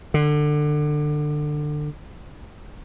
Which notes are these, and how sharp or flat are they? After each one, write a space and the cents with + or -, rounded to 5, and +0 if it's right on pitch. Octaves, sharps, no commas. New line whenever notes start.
D3 +20